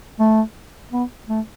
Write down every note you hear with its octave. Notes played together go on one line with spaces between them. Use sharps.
A3
B3
A3